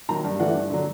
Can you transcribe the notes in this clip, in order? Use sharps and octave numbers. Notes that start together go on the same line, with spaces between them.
D#3 F#3 A#5
G2
E3 A3 D4 F#5
G2
D3 F#3